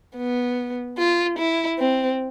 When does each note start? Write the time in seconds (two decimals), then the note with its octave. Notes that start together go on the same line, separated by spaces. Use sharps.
0.17 B3
0.98 F4
1.38 E4
1.79 C4